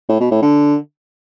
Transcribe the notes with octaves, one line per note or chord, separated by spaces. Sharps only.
A2
B2
A2
D3